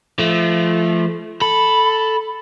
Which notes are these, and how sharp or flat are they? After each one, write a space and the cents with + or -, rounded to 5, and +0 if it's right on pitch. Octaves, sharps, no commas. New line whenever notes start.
F3 -30 A3 -25
A4 +0 B5 +0